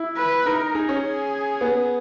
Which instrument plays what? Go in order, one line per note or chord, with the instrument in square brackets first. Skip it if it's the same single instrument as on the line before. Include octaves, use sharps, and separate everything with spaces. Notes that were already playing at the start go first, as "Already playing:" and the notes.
Already playing: [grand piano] E4
[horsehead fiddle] B4
[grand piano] D#4 [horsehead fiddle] A#4
[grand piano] D#4 [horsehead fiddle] G#4
[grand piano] C#4
[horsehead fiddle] G#4
[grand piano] B3